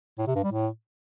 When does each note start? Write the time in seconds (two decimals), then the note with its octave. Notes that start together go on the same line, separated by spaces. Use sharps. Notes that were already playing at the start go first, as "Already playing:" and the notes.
0.19 A2
0.27 C3
0.35 G2
0.44 G3
0.52 A2